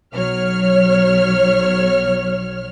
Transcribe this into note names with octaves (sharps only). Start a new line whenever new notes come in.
B1 F#3 C#5 F6